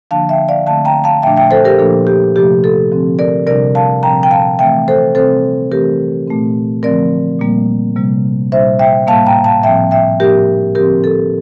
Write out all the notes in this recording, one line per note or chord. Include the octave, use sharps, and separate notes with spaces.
D3 F3 A#3 D4 F5 A5
E5 G5
D5 F5
D3 A3 C4 F5 A5
G5 A#5
F5 A5
A#2 F3 A3 D4 E5 G5
E5 G5
A4 C5
G4 A#4
A#2 F3 A#3 D4 A4
G4
C3 F3 A3 G4
A4
D3 F3 C4
A#4 D5
C3 G3 D4 A#4 D5
F5 A5
A#2 F3 C4 G5 A#5
G5
F5 A5
E3 A3 C4 E5 G5
A4 C5
C3 G3 C4 A4 C5
E3 A3 C4 G4 A#4
A#2 A3 C4
D3 F3 A3 C4 A#4 D5
A#2 G3 A#3
C3 G3 A#3
A#2 G3 D4 C5 E5
E5 G5
A2 G3 A#3 F5 A5
G5 A#5
F5 A5
A2 F3 C4 E5 G5
E5 G5
A2 F3 A#3 D4 G4 A#4
D3 F3 C4 G4 A#4
A4